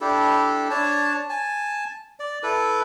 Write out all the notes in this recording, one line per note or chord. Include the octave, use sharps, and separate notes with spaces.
D4 E4 G4 A4
D4 C#5 A5
G#5 A5
D5
E4 A4 B4